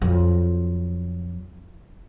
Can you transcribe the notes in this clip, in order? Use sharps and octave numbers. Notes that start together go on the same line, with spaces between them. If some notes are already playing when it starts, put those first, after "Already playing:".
F2 F#3